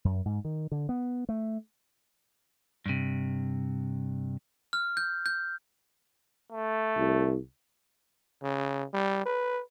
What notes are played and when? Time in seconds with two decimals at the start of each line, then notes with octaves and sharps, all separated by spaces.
0.05 F#2
0.25 G#2
0.45 D#3
0.72 D3
0.89 B3
1.29 A3
2.86 G2 C3
4.73 F6
4.97 G6
5.26 G6
6.52 A3
6.97 C2
8.43 C#3
8.94 G3
9.26 B4